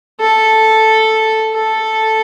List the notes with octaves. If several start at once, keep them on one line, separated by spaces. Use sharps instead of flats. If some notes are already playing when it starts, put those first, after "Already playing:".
A4
A4